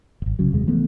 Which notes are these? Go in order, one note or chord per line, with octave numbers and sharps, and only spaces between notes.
D1 G#1
C2 C#3 F#3
F1 D#2 C3 G#3
E3 F3 A3 B3